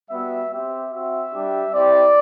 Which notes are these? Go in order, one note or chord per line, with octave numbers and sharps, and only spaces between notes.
G3 B3 F#4 E5
C4 G4 E5
C4 F#4 E5
G3 D4 G4
C4 E4 G4 D5